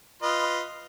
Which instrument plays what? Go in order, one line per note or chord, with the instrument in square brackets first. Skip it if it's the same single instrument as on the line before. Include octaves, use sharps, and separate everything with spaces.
[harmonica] F4 B4 D#5